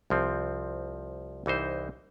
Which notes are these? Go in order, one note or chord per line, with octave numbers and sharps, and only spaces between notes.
C2 F3 C4
C2 E3 D#4 C5